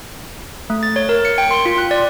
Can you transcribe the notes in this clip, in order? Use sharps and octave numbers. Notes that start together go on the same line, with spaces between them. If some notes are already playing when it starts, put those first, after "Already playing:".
A3
A6
C#5
A#4
C#7
G5
C6
F4
F#6
D5